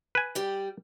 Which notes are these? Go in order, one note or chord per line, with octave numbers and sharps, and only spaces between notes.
B4 G#5
G3 G4 G5